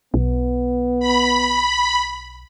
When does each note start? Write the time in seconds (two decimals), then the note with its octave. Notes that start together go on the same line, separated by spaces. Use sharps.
0.14 B1 B3
1.00 B5